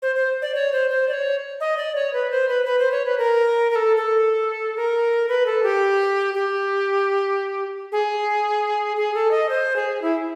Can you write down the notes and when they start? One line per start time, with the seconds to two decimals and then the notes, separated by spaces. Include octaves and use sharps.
0.02 C5
0.16 C5
0.42 D5
0.55 C#5
0.72 C5
0.90 C5
1.08 D5
1.13 C#5
1.60 D#5
1.77 D5
1.95 C#5
2.13 B4
2.31 C5
2.49 B4
2.65 B4
2.79 C5
2.92 C#5
3.06 B4
3.18 A#4
3.71 A#4
3.75 A4
3.97 A4
4.76 A#4
5.29 B4
5.46 A4
5.63 G4
6.34 G4
7.92 G#4
8.97 G#4
9.14 A4
9.31 D#5
9.49 C5
9.76 G#4
10.02 E4